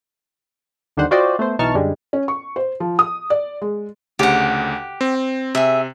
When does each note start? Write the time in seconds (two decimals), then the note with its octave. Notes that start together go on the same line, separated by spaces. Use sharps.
0.97 D#2 D3 D#3 G3 C5 F#5
1.11 F4 F#4 C5 D5 D#5 G5
1.39 A3 B3 C5
1.59 B1 E3 D#4 A5 C#6 F6
1.75 F#2 D3 G3 G#3
2.13 C#4
2.28 C#6
2.56 C5
2.80 F3
2.99 D#6
3.30 D5
3.62 G#3
4.19 D2 C#3 G4 F#5
5.01 C4
5.55 C3 G#4 E5